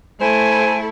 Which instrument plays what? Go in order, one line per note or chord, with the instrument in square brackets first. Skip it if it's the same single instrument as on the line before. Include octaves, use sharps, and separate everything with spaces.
[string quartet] A3 E4 A4 [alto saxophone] C5 [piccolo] G#5